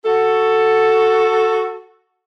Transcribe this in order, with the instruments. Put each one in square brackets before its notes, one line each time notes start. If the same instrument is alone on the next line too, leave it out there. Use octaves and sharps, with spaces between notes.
[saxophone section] F#4 A4